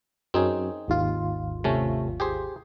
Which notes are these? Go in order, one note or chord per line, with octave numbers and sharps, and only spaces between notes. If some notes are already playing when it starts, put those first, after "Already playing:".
F#2 C4 C#4 D#4 G#4
G#1 D#2 F4
C3 A3 C#4
G4 G#4 C5